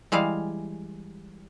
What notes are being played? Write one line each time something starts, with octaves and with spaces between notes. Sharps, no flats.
E3 G3 G#3 F5